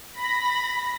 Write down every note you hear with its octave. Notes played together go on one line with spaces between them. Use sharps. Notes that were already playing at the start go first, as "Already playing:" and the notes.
B5 A#6